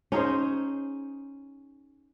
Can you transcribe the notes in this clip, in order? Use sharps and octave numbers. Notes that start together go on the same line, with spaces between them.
C#4 D#4 G#4 C5